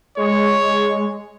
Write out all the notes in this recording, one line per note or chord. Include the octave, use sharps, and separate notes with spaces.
G#3 C#5